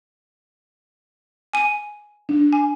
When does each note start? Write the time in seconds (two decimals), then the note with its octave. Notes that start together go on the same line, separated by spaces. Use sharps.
1.53 G#5 D#7
2.29 D4
2.53 G#5